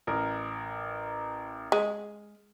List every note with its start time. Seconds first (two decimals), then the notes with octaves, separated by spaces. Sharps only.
0.07 A1 A#4
1.72 G#3